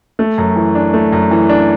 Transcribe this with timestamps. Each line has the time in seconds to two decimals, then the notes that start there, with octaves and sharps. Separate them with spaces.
0.19 A3
0.38 F#2
0.56 E3
0.75 D4
0.94 A3
1.12 F#2
1.31 E3
1.49 D4